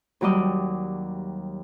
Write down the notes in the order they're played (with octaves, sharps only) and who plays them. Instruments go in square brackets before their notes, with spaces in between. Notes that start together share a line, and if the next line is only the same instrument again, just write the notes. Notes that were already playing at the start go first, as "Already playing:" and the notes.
[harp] D#2 F#3 G3 D5 D#5